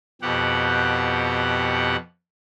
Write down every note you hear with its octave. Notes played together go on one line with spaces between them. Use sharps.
F2 B2 G4 F#5